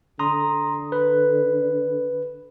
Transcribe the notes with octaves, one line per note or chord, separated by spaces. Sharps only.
D3 A#5 C6 D#6
B4